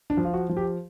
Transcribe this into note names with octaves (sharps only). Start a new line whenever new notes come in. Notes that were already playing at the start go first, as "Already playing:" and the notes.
D4
F3
F4
F#4
F3
G4